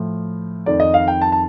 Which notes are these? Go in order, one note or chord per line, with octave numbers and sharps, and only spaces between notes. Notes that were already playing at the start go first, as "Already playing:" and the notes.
Already playing: A2 F3
F2 D#3 D5
D#5
F5
G5
A5
A5